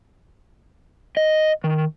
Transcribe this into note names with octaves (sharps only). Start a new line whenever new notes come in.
D#5
D#3